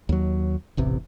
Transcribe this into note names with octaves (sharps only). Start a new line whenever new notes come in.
D#2 F#3
E1 A1 C3 E3